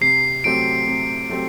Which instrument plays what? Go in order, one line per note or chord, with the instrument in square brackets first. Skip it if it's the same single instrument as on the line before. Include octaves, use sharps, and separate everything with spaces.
[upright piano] C3 [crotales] C7
[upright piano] F#3 A3 C4 G4 [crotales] D7
[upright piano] C3
F#3 A3 C4 G4